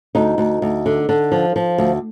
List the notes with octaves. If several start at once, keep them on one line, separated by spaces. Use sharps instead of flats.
D2 D#4
D2
D2
D3
D3
F3
F3
D2